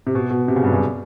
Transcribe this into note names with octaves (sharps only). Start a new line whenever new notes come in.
C3
B2
B2
C3
C#3
G2
F#2